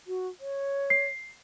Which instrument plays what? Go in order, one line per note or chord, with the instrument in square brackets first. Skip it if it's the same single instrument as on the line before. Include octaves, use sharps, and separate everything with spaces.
[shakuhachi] F#4
C#5
[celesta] C7